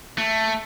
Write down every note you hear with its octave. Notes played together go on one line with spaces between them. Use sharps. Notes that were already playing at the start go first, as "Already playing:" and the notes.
A3